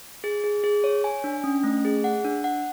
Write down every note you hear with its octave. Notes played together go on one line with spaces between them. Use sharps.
G#4
G#4
G#4
C#5
G#5
D4
C#4
A3
G#4
F#5
D4
F#5